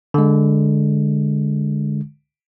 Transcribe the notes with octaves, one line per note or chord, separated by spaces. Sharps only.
D3 G#3